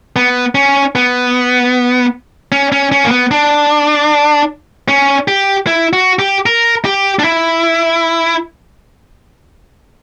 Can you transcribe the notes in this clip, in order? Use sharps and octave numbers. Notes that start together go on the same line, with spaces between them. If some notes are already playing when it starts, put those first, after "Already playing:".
B3
C#4
B3
C#4
C#4
C#4
A#3
B3
D4
C#4
G4
E4
F#4
G4
A#4
G4
D4
E4